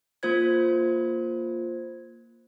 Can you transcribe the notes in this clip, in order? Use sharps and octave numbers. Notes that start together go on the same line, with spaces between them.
A#3 F4 C5 G#6